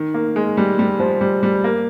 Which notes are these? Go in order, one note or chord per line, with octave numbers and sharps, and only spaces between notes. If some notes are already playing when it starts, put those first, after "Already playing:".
Already playing: D#3
A#3
G#3
G3
G3
F3
G3
G3
A#3